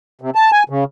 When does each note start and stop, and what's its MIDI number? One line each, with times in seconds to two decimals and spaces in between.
0.21 0.30 48
0.35 0.51 81
0.52 0.63 80
0.70 0.84 49